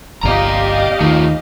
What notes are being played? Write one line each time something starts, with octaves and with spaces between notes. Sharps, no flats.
G1 C2 C3 G4 D5 D#5 F5 A#5
D#2 D#3 A3 F4